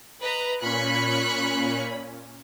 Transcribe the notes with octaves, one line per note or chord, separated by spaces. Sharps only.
B4 D#5 A#5
A#2 C#4 B5 C#6 F#6